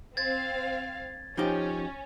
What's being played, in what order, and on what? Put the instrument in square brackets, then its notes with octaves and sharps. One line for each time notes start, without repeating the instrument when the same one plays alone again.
[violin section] C4 F5 [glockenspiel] G#6 A6
[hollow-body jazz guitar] F3 D#4 G4 [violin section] C#4